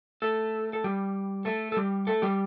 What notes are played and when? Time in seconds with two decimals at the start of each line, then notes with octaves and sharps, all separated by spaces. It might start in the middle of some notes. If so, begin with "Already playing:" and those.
0.22 A3 A4
0.73 A4
0.84 G3 G4
1.45 A3 A4
1.72 A4
1.77 G3 G4
2.07 A3 A4
2.22 G3 G4